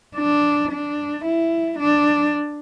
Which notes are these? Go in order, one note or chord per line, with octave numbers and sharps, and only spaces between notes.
D4
D4
E4
D4